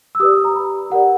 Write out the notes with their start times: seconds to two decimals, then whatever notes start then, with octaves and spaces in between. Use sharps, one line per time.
0.15 E6
0.20 G4 B4 D5 D#6
0.45 A#5
0.56 B5
0.90 G4 A#4 D5 F#5